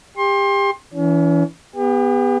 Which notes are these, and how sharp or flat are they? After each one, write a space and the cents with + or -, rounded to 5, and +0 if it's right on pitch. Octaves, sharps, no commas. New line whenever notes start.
G4 +30 C6 +30
E3 +0 C#4 +40
B3 +0 G4 +40